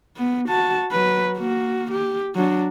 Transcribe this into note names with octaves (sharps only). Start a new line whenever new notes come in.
B3
F#4 A5
F#3 B4
A#3 F#4
G4
F#3 D4